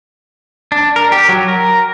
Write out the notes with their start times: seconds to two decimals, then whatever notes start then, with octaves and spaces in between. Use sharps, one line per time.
0.72 D4
0.96 A#4
1.12 G4
1.29 F#3
1.48 A#4